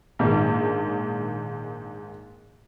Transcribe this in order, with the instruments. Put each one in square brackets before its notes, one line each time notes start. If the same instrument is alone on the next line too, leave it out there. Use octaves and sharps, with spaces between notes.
[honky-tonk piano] A#1 G#2 D#3